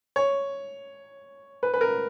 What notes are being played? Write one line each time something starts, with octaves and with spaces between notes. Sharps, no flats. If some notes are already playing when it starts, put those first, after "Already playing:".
C#5
B4
B4
A#4